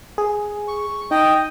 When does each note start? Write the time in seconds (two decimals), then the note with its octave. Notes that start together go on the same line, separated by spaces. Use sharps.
0.18 G#4
0.68 C#6
1.11 D#4 D#5 G5